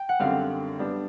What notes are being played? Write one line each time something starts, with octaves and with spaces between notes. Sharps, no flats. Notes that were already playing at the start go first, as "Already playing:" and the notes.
Already playing: G5
F#5
F#2 D3 G3 C4 F5
G3 B3 D4